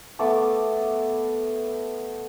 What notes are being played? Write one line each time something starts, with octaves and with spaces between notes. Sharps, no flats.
A3 B3 A5 D6